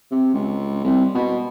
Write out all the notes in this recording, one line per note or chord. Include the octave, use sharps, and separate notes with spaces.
C3
C#2
C2
B2